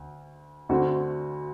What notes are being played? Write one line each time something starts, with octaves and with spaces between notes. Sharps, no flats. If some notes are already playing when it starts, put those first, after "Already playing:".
Already playing: D2
D2 D3 A3 C4 F#4